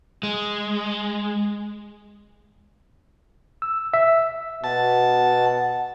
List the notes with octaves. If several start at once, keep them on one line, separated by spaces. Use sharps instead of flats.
G#3
E6
E5
B2 F#5 A5